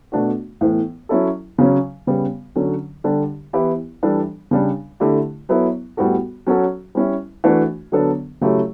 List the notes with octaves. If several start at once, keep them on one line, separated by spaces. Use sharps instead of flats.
B2 A3 D4 F#4
A2 E3 B3
F#3 C#4 E4 A4
C#3 F#3 C#4
C#3 G3 B3
D3 F#3 C#4
D3 G3 D4 G4
E3 B3 E4 G4
E3 G3 D4 A4
C#3 G3 D4
D3 A3 E4 G4
F#3 B3 E4 A4
A2 G3 B3 F#4 A4
F#3 C#4 F#4 A4
G3 C#4 E4
E3 A3 D4 F#4
D3 F#3 B3 D4 A4
C#3 F#3 A3 E4 G4